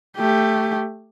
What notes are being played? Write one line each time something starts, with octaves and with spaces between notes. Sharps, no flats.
A3 G4